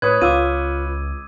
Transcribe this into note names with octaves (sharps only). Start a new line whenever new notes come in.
A2 B4 C#5 D#6 G#6
C#2 F4 D6 E6 D#7